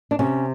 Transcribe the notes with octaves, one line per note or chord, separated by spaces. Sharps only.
D4
C3 C#4